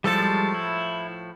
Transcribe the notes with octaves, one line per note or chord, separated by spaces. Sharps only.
A2 F3 G3 G#3 A4 A5
E4